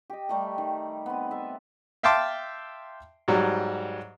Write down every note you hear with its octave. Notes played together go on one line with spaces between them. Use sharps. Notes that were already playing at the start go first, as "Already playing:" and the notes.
G4 D#5
G3 A3 A#5
D#3
B3 C4
E5 A5
E5 F5 G5 A5 C6 D6
G#2 F#3 G3